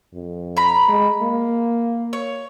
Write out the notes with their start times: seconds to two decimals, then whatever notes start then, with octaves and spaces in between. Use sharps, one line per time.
0.13 F2
0.57 A#5 B5
0.88 G#3
1.22 A#3
2.13 C#5